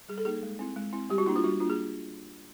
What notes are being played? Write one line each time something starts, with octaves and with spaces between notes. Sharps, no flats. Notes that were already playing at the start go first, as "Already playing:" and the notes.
G3 G#4
A4
A#3 D#4 G#4
G#3
C4 E4
G#3
C4 E4
G3 G4
F#4
A#3 D4 E4
F4
G3 F#4
A#3 D4 F4 G#4